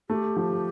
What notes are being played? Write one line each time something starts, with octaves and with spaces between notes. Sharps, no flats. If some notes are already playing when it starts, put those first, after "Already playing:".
A3 G4
F3